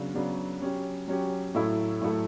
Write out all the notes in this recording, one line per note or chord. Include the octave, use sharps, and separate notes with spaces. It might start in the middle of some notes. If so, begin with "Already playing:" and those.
Already playing: C#3 F#3 B3 D4
C#3 F#3 B3 D4
F#3 C#4 G4
F#3 C#4 G4
A2 F#3 A3 E4 A4
A2 F#3 A3 E4 A4